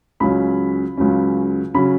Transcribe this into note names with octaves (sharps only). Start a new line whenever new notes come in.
C#2 C#3 F#3 C#4 B5
C#2 C#3 F#3 C#4
C#3 F#3 C#4 B5